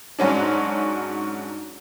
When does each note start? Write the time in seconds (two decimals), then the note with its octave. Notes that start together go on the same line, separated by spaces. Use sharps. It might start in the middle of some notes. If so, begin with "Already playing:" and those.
0.19 G#2 F#3 C#4 D4